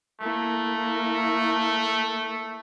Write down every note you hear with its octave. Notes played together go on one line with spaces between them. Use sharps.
A3 A#3 E4